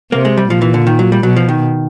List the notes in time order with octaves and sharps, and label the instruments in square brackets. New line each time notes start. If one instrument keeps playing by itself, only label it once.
[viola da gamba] C3 [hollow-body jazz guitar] A#3
[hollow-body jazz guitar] G#3
G3
[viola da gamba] A#2 [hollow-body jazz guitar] F3
[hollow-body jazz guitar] E3
D3
D#3
F#3
G3
[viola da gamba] B2 [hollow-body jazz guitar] F#3
[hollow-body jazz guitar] F3
D#3